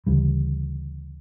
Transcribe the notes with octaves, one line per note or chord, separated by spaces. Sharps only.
D2 C#3 E3 G3